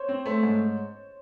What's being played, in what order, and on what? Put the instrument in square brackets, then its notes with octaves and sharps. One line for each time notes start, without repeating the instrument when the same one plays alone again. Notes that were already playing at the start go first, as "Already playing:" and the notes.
Already playing: [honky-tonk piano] C5 C#5
[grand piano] C4
[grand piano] A3 [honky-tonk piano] C5
[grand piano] G#2